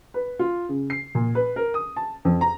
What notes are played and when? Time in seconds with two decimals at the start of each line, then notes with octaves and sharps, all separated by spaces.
0.14 B4
0.39 F4
0.69 C#3
0.90 C7
1.15 A#2
1.35 B4
1.56 A#4
1.74 D#6
1.96 A5
2.25 F2
2.41 A#5